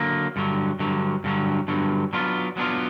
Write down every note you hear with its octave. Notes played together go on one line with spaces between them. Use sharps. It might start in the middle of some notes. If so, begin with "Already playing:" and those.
Already playing: D3 F#3 A#3
G2 D3 F#3
G2 D3 F#3
G2 D3 F#3
G2 D3 F#3
F#3 B3 D4 F4
F#3 B3 D4 F4